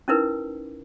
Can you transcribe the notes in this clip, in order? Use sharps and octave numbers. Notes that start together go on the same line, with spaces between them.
C#4 D#4 E4 A#4 B4